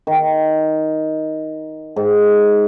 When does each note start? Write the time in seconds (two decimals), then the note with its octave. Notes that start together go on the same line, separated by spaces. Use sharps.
0.07 D#3
1.96 G#2